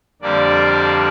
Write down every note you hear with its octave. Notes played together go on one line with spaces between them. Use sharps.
F2 D3 G3 A#3 D4 D5